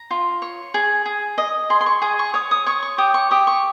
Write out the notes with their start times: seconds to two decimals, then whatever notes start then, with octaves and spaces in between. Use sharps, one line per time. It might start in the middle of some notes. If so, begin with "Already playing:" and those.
Already playing: A#5
0.11 F4
0.42 C#5
0.74 G#4
1.06 G#4
1.38 D#5
1.70 G#4 C6
1.81 C6
1.86 C#6
2.02 G#4 D#6
2.19 C#6
2.34 C#5 D#6
2.51 D#6
2.66 C#5 C#6
2.83 C#6
2.98 G4 D#6
3.14 C#6
3.31 G4 D#6
3.47 C#6